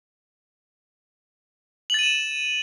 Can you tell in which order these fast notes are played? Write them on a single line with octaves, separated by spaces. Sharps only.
F#7 A6 D#7 E7